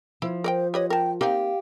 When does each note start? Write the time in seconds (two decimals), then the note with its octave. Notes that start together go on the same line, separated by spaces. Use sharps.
0.22 F3 E4
0.44 A#4 C5 D5 G5
0.74 G4 B4 C#5 D#5
0.90 A#4 G5 A5
1.21 A#3 C4 D#4 G4 F5